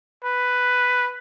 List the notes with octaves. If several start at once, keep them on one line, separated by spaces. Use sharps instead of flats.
B4